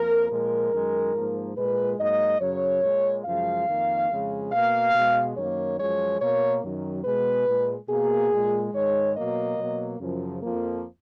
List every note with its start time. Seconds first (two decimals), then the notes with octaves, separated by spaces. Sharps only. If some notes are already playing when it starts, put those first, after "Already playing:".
Already playing: F2 F3 A#3 A#4
0.30 A#2 F3 G#3 A#4
0.72 F#2 D#3 G#3
1.15 G#2 F3 A#3
1.56 A#2 G#3 B4
1.98 G#2 F#3 A#3 D#5
2.40 F#2 C#3 F#3 C#5
2.83 A#2 G#3
3.25 F#2 C#3 F3 G#3 F5
3.68 F2 D#3 A#3
4.10 F2 C#3 G#3
4.52 B2 A#3 F5
4.93 B2
4.99 G#3
5.36 F#2 D#3 A#3 C#5
5.78 F#2 F3 G#3 C#5
6.20 B2 A#3 C#5
6.63 F#2 D#3 F#3
7.04 B2 G#3 B4
7.47 A#2 G#3
7.89 B2 A#3 G#4
8.32 A#2 G#3
8.74 G#2 D#3 G#3 C#5
9.15 B2 F#3 A#3 D#5
9.58 B2 F#3 A#3
10.00 F#2 C#3 F3
10.42 F2 F3 A#3